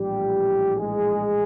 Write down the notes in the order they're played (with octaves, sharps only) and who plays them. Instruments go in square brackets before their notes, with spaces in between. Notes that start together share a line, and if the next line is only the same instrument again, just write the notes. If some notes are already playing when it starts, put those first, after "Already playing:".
Already playing: [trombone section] A#1 A2 E3 G3 G4
G#3 G#4